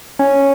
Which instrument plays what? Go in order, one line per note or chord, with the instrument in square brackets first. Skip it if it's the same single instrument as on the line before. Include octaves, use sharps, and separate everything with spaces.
[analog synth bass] C#4